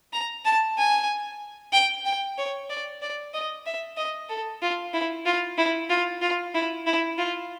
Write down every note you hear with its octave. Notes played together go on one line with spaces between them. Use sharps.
A#5
A5
G#5
G5
G5
C#5
D5
D5
D#5
E5
D#5
A4
F4
E4
F4
E4
F4
F4
E4
E4
F4